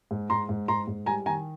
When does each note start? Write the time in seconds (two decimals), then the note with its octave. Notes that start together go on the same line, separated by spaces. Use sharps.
0.11 G#2
0.30 G#2 A#5 C6
0.49 G#2
0.68 G#2 A#5 C6
0.87 G#2
1.06 G3 G#5 A#5
1.26 D#3 G#5 A#5